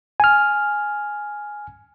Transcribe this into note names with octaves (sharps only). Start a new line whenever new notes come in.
G#5 F6